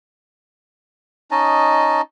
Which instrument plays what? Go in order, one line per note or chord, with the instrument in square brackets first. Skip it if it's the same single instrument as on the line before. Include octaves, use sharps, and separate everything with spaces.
[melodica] C#4 D#4 D#5 A5